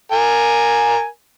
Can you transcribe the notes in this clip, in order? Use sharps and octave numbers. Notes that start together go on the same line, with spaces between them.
A#4 G#5